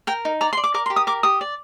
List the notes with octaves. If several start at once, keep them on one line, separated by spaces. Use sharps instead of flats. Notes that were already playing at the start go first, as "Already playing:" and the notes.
A#4 G5
D#4
D5 A#5
C6
D5
D6
A#4 D6
C6
G4
D#6
A#4 D6
G4 D#6
D5